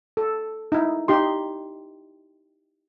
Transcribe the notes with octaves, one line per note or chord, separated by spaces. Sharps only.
A4
D#4 E4
D#4 G4 C6